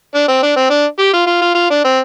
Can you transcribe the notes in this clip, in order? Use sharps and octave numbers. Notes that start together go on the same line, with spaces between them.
D4
C4
D4
C4
D4
G4
F4
F4
F4
F4
D4
C4